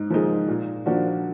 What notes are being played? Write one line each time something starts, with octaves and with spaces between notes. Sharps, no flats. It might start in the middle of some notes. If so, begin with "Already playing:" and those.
Already playing: G#2 D#4
F3 A#3 D#4 G#4
A#2
F3 A#3 D4 F#4